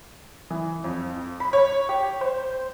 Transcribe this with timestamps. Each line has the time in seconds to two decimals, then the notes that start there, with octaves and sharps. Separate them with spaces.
0.51 E3
0.84 F2
1.40 B5
1.53 C#5
1.89 G4
2.21 C5